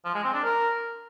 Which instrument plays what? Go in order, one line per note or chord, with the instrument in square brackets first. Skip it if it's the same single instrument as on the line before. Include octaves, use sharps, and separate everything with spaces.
[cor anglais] F3
G#3
C4
D4
A#4